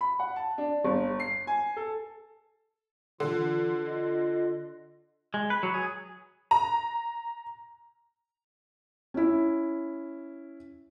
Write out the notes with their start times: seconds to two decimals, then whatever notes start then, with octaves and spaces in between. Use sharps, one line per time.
0.01 B5
0.19 F#5
0.36 A5
0.58 D4
0.85 G1
1.20 C7
1.47 G#5
1.77 A4
3.20 D3 E3 F4
3.86 F4 D#5
5.34 G#3
5.50 B4
5.63 F#3
5.74 G#4
6.51 A#5
9.14 C#4 E4